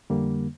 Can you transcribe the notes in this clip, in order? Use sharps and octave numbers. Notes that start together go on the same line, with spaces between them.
F2 D3 G3 A#3